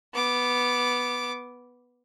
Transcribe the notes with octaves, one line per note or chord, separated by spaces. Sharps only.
B3 D6